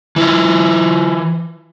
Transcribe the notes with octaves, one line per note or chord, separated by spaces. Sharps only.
E3 E4 F4